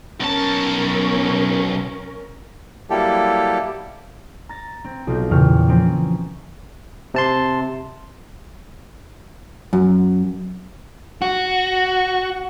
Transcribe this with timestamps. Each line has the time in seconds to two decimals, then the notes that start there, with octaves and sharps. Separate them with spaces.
0.20 B1 C#4 A#4 A5
2.90 F#3 G3 A#3 E4 G4 A4
4.49 A#5 A6 A#6
4.84 C4
5.07 B1 F4 G6
5.30 E2 A#2 C#3 G5 C#6 F6
5.68 F3 A#3 C4 C#4
7.14 C3 A5 C6
9.73 F#2
11.22 F#4